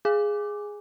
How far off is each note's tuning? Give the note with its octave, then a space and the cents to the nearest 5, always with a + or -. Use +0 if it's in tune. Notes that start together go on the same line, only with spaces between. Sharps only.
G#4 +0 G#5 -15 D6 +0